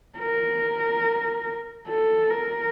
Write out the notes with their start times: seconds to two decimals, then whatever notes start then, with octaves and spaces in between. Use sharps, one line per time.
0.19 A#4
1.88 A4
2.30 A#4